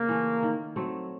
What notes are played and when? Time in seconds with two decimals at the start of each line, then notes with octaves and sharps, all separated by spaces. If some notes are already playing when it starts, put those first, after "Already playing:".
Already playing: C#3 A#3
0.08 E3 A3
0.43 D#3
0.76 F#3 A3 C4